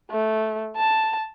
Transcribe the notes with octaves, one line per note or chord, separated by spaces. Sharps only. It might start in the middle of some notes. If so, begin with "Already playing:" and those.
A3
A5